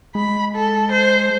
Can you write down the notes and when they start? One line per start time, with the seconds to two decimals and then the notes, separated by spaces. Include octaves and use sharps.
0.15 G#3 B5
0.55 A4
0.92 C5